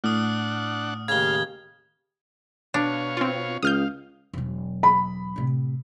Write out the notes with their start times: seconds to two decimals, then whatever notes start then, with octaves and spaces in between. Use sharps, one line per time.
0.04 A2 D4 F#5 D#6 F6
1.08 D#2 C#3 F5 G#6 G7
2.74 B2 D4 C#5 F5
3.17 C4 F4
3.62 C#2 F5 D#6 F6 G6
4.33 E1 F#3
4.83 B5
5.36 A2 C3